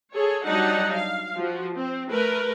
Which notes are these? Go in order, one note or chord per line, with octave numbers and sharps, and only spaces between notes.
G#4 A4 C#5
F#3 G3 D4 D#4 F#5
F5
F3 F#4
C4
A3 A#4 B4